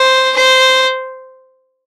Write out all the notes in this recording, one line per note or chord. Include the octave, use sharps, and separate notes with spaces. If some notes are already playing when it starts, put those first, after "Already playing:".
Already playing: C5
C5